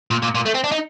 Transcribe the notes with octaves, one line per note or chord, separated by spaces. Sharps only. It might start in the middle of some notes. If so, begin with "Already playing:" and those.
A#2
A#2
A#2
A3
C4
D4
D#4